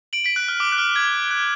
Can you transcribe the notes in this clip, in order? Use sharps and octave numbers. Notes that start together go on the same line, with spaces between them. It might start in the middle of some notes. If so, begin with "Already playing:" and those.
D7 F#7
B6 D7
F#6
F6
D6
F#6
F6
G#6
F#6